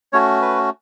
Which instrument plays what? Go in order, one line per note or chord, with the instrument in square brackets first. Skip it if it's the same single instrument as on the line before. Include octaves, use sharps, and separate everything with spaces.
[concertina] A3 C#4 F#4 C#5
B4